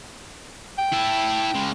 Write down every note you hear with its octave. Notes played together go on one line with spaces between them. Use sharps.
G5
E4 A4
C#3 G#3